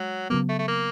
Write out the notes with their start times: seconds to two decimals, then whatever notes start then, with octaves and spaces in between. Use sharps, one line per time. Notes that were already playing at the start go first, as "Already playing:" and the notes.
Already playing: F#3 G#3
0.30 C#3 F#3 A#3 B3
0.49 A3
0.59 A3
0.68 A#3